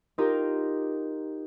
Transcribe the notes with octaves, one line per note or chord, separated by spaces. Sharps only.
D#4 F4 G4 A#4